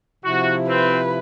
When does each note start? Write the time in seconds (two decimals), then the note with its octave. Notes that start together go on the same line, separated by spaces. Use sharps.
0.25 C3 F3 E4 F#4
0.69 C4 B4